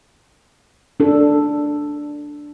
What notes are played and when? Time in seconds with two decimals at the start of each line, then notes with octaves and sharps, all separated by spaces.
1.00 D4 A4